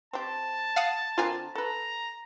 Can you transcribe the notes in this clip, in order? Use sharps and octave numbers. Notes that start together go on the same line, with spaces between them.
C4 G4 A5
F5 F#5 D#6
D3 C4 F4 A#4 G#5
A4 B4 A#5